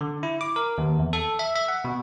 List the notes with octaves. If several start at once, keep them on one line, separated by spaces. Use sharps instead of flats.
D3
E4
D6
A#4
D#2
E2
A4
E5
E5
F#5
B2